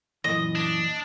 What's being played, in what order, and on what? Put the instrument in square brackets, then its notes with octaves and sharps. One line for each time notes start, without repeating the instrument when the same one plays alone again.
[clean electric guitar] F#2 A#2 E3 [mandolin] D#5
[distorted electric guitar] D4